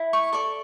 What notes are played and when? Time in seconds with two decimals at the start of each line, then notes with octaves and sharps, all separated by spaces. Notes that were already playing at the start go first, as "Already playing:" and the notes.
Already playing: E4
0.13 C#6
0.33 A4 D5 C#6